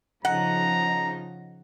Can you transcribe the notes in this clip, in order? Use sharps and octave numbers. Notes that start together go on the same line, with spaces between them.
C#3 F3 D#4 F#5 A#5